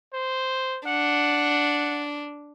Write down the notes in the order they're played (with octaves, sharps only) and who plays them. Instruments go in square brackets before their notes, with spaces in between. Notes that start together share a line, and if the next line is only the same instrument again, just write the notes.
[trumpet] C5
[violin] D4 [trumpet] F#5